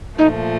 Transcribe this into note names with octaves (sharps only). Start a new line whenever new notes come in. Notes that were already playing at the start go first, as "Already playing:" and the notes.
A#2 F3 A3 D#4